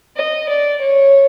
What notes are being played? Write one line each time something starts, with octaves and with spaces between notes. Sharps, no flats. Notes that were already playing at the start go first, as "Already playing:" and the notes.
D#5
D5
C#5